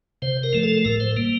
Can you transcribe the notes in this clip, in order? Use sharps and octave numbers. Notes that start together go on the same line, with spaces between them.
C3 C5
A#4
F3 A3
A4
A2 A#4
C5
G3 A#3